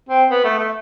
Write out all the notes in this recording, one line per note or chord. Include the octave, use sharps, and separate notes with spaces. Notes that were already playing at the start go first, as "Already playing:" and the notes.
C4
B3
A3
A3